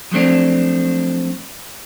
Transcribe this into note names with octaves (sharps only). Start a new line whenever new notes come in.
F3 F#3 A3 C4 D4